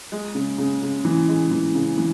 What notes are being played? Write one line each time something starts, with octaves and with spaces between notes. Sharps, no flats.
G#3
C#3
C#3
C#3
E3
G#3
E3
C#3
E3